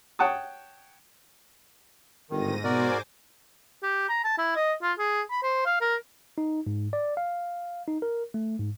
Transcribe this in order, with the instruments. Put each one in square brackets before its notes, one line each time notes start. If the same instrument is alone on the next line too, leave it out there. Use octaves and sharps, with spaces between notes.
[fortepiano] C#5 F#5 G5 A5 C#6 D#6
[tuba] G1 [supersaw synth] G#2 A#6 D#7 [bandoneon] D#3
[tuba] B2 [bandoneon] F#4 A#4 D5 [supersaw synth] C5 G#5 D6
[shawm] G4
A#5
A5
E4
D#5
F4
G#4
B5
C5
F5
A#4
[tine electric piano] D#4
G#2
D5
F5
D#4
A#4
A3
G#2